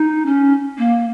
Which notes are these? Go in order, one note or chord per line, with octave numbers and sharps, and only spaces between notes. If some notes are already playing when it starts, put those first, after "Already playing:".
Already playing: D#4
C#4
A#3